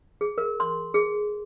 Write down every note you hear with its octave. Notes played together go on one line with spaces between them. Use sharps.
G#4
A#4
C6
G#4